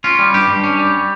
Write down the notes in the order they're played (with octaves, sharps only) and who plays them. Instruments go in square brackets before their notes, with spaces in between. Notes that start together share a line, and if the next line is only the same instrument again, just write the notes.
[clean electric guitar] C#4 F4
G3
G2 G4
G2
C#4
G3